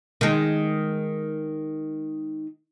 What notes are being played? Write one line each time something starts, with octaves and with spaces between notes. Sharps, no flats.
D#3 G#3